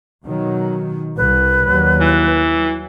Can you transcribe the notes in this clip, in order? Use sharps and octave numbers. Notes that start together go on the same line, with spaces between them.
B2 D#3 F#3
C2 B4
D#2 F#3 G3
E3
F#3